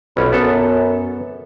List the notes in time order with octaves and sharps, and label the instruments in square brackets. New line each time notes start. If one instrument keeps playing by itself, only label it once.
[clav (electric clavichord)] B1 C#4 [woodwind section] F2 B4
[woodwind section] F#2 [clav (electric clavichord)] B3 A4